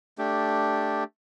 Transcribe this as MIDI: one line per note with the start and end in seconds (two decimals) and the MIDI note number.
0.18 1.04 57
0.18 1.04 62
0.18 1.04 67